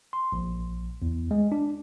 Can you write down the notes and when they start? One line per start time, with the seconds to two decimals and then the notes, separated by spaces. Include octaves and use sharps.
0.13 C6
0.32 A#1
1.02 E2
1.31 G#3
1.52 D4